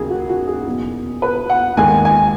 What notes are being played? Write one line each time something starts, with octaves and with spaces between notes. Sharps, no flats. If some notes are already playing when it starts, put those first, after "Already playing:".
Already playing: D#2 C#3 F#3 G#4
F#4
F#4
G#4
E2 B2 F#3
B4
F#5
D#2 D#3 G#3 G#5
G#5